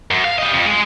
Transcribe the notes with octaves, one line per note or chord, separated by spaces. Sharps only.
F#2
F5
G3 D#5
F2
G#3 G#4